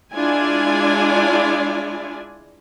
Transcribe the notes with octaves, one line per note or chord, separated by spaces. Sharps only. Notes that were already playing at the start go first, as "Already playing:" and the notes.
G#3 D4 E4 F4 D5 G#5